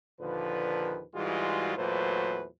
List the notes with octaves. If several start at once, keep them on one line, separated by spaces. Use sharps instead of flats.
D#2 A#2 D3 F3 B4
G#2 E3 G3 G#3 F4 F#4
E2 A#2 F#3 A3 B4 C5